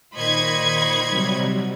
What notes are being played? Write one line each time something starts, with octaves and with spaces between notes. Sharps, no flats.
A#2 D#3 C5 D#5 B5 C#6 G#6
C3 F#3 G3